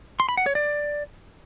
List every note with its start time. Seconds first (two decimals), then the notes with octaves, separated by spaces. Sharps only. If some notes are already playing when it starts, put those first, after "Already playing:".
0.20 C6
0.29 B5
0.37 F#5
0.46 C#5
0.55 D5